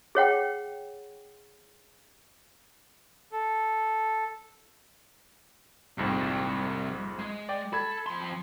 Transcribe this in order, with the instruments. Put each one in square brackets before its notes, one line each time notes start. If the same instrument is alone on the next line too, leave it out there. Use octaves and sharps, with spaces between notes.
[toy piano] G#4 C#5 F#5 G5
[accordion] A4
[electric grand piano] A#1 F2 G#2 [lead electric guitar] C3 G3
[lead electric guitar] G#3
[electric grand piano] D5 G5
[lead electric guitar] A4 [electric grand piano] B5 G#6
[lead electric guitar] F2 C6